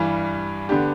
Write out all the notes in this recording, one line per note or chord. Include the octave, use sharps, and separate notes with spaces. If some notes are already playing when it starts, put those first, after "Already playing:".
Already playing: G2 E3 G3
D3 B3 D4 G4